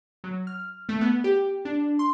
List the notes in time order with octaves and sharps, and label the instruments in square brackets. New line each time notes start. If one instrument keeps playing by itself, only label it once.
[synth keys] F#3
F6
A3
B3
G4
D4
C6